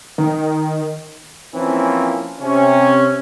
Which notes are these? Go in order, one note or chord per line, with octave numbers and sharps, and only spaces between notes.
D#3
E3 F3 A#3 C4 C#4
C3 C#4